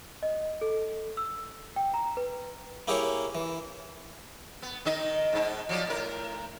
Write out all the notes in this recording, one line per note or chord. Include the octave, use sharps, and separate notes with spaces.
D#5
A4
E6
G5
A#5
B4
A#3 E4 G4 G#4 A#4 C#5
E3
B3
D#3 D#4 D#5
G#2 D#4
F3 F#3 D5
A2 A#4